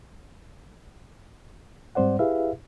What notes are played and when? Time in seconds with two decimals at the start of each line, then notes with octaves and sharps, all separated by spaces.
1.95 G#2 G3 C4 C5 D5 F#5
2.19 E4 G4 G#4 B4 E5 F5